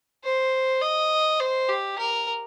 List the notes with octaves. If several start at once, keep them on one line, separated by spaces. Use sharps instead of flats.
C5
D#5
C5
G4
A#4